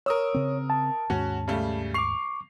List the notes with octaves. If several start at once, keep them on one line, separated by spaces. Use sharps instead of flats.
A#4 C#5 D#6 E6
C#3 C4
A5
D#2 G#2 C#4 F#4
C#3 G3 A3
C#6 D6 C7 F7